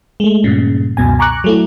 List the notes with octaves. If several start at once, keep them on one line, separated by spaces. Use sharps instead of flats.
G#3 A3
G2 A#2 C#3
C#2 F#2 B2 G#5
G#5 A#5 C#6 D6 F#6
F#3 A3 E4